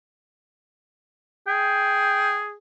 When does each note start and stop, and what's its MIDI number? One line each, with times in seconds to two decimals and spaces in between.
1.47 2.55 68
1.47 2.40 79